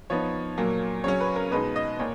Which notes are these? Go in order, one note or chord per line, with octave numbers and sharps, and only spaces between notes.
F3 B3 D#4 C#5
A#2 F#3 A#3
C#3 F#3 C#4 C#5
B4
A#4
B2 G#3 D#4 B4
D#5
A#2 C#5